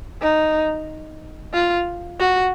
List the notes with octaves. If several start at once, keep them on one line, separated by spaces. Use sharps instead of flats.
D#4
F4
F#4